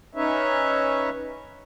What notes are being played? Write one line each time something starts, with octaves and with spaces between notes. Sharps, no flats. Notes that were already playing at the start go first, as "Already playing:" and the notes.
C#4 D#4 B4 C#5 E5